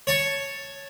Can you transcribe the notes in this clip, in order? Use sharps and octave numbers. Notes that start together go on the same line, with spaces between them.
C#5 A5 C#6